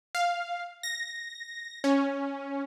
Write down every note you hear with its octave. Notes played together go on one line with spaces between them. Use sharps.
F5
A#6
C#4